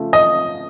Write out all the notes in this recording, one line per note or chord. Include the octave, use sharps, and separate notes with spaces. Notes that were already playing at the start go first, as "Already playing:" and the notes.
Already playing: C#3 F3 A3
D#5